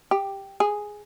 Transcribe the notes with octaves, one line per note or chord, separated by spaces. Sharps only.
G4
G#4